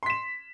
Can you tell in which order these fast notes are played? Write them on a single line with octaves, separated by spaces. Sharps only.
C6 B6 E7